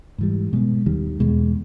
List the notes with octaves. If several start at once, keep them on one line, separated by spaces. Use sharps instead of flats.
G#2 E3 G3
B2 G#3 B3
D#2 D#3 G3
E2 B2 G#3